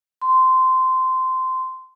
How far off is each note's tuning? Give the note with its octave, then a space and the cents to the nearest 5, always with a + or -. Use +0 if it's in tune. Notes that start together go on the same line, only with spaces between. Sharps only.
C6 -15